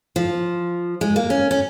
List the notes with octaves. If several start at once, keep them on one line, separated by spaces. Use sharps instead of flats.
F3
G#3
A#3
C#4
C#4